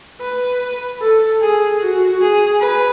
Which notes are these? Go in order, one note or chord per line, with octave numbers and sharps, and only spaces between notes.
B4
A4
G#4
F#4
G#4
B4